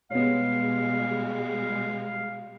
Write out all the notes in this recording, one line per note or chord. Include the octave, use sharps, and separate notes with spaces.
B2 G3 G#3 B3 C#5 F5